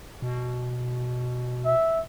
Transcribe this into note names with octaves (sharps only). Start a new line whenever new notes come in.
B2
E5